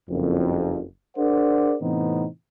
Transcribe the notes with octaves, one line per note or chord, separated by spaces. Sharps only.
F#1 F2
D4 G#4 A#4 C5 D5 F#5
A2 C3 E3 B3 C4 D#4